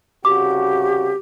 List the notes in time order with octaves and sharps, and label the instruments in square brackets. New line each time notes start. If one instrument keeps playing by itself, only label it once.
[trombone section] C2 C#3 F#4 [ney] G4 [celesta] D6